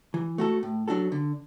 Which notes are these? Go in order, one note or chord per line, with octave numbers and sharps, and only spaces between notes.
E3
A3 F#4 A4
A2
F#3 D4 F#4 A4
D3